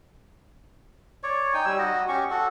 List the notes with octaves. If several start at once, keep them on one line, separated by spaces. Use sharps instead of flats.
C#5 D5
D#4 G5 G#5
G3 E6
F#4 D#5
C#4 G4 C#6
F#4 A4